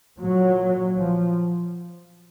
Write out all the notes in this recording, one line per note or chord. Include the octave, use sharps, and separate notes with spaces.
A#2 F#3
F3